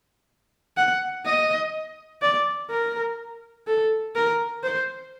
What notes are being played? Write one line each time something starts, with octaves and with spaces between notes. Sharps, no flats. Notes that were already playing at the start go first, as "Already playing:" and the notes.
F#5
D#5
D5
A#4
A4
A#4
C5